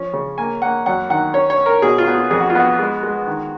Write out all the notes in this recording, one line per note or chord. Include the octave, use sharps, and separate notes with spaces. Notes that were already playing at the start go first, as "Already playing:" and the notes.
Already playing: F3 C#4
C#3
A#3 G#5
A#3 F#5
F#2 F#5
D#3 F#5
C#4 C#5
C#5
C#4
A#4
B2 G#4
F4
B3
F4
F2 G#4
F#4
F4
B3 F#4
G#3
G#3
D#3